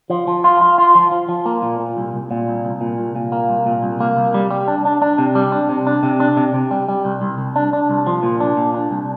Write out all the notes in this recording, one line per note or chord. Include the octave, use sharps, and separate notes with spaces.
F3
F3
F4
F4
F4
F3
F3
F3
A#3
A#2
A#2
C2
C2
A#2
C2
C2
A#2
C2
A#2
A#3
C2
A#2
C2
A#3
C2
G3
G3
D4
D4
D4
C3
G3
D4
C3
D4
C3
D4
C3
C3
G3
G3
C2
C2
C2
D4
D4
C2
F3
A#2
D4
A#2
D4
C2